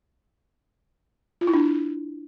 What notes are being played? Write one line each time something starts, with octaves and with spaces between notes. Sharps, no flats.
F4
E4
D4